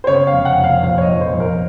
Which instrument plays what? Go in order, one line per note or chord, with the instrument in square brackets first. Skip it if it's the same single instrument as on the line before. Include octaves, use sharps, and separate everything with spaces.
[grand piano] C5
C#3 C#5
F5
F1
F#5
F1
F5
A#1 F5
C#5
D#5
A#1
C5
A#1
A#4